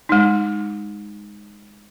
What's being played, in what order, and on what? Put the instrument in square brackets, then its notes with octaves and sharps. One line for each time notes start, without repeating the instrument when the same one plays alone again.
[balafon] G#3 D#4